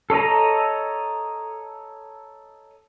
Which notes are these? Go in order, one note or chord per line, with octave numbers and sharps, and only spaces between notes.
A4 C#5 D#5 A#5